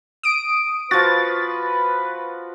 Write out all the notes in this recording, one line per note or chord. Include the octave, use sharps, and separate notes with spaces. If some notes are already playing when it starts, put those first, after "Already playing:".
D#6 D7
F3 F#4 B4 A6